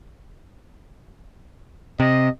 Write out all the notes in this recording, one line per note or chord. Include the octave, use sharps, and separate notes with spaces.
C3 D#5